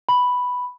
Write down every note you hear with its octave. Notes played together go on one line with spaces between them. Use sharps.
B5